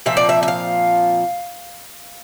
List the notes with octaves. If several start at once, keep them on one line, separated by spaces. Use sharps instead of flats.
A#2 F3 C4 E5
D5
E5
E5
F5